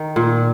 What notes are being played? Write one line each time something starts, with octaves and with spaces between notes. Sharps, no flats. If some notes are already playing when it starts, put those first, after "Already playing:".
Already playing: D#3
A#2